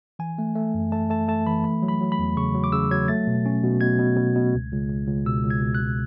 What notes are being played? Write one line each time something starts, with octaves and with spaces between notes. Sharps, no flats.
E3 G#5
A3
A3
F#2
A3 A5
A3 A5
A3 A5
E3 B5
A3 B5
F#3
B5
F#3
B5
E2
C#3 C#6
F#3
D6
C#3 E6
F#3 G#6
A3 A6
B2
C#4
B2
B2 G#6
B2
B2
B2
C#2
C#2
C#2
C#2
B2 E6
C#2
G#6
B2
F#6
C#2